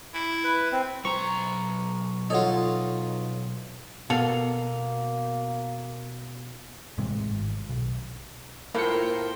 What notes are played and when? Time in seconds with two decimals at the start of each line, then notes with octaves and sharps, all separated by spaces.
0.14 E4
0.44 B4
0.72 C4
1.05 B1 C5 A#5 C#6
2.30 D#4 F4 A4 C#5 F#5
4.10 B2 A#3 A4 F5
6.98 A1 C3 G#3
7.31 G#1
7.69 B1
8.74 A2 A#3 F4 A#4 C5 G5 C#7